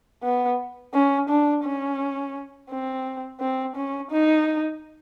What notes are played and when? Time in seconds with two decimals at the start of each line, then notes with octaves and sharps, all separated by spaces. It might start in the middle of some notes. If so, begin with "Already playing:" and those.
0.23 B3
0.93 C#4
1.29 D4
1.64 C#4
2.70 C4
3.40 C4
3.76 C#4
4.11 D#4